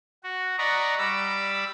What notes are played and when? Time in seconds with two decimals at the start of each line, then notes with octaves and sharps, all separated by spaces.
0.23 F#4
0.58 D5 D#5 F#5 A#5 B5 C#6
0.98 G3 B5 D6 E6